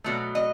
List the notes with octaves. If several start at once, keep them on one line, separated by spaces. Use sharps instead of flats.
B2 F#3 A3
D#5